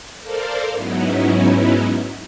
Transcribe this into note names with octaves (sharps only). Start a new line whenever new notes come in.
A4 A#4 C5 D5 F5
G#2 F#3 B3 C#4 D#4 E4